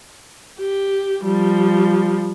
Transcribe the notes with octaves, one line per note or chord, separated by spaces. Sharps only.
G4
F3 G3